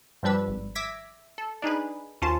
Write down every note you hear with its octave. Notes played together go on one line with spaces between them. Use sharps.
G2 F3 G3 D4 B4 E6
G#1
E5 D6 G#6 A#6 B6
A4
D4 D#4 G#4 B4
D#2 C#4 F4 C5 A5